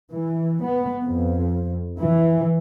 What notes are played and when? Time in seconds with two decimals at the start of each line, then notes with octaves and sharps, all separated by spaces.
0.12 E3
0.65 B3
1.04 F2
1.99 E3